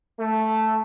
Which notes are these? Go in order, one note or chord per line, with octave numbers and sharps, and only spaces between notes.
A3